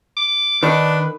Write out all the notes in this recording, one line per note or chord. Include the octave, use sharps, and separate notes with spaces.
D6
D#3 D4 B4